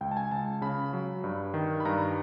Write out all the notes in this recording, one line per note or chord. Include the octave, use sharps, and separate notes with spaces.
C#2 G5
A5
G#5
C#2 A5
C#3 B5
F#3
G2
D#3
B5
G2 A#5